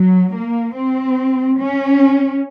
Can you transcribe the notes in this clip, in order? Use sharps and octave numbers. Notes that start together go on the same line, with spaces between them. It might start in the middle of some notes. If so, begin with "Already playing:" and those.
Already playing: F#3
A#3
C4
C#4